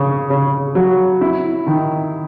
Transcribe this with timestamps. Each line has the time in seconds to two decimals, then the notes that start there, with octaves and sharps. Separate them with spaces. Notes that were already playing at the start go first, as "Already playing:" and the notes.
Already playing: C#3
0.30 C#3
0.75 F#3
1.21 E4
1.66 D#3